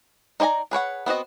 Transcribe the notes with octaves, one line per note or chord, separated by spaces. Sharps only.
D#4 C5 D5 G#5 A#5
G#4 B4 C#5 F#5
B3 C4 F#4 D#5